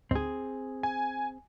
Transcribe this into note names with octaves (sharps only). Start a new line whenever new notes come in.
D2 G#2 C4 D#4 G#4
G#5